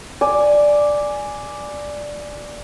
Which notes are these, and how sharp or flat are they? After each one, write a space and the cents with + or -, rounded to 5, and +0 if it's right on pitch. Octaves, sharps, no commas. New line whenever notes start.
D5 +0 G#5 +0